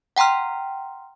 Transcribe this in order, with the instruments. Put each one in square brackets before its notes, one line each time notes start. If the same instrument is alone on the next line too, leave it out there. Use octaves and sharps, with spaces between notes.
[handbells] F#5 G5 A#5 C6 F6